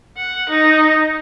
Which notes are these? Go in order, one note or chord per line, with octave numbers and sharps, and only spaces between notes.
F#5
D#4